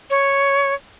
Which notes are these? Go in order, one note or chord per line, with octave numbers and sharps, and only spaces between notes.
C#5